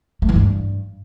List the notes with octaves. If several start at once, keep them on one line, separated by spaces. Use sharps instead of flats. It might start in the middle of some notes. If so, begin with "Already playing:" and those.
A3
E3
G2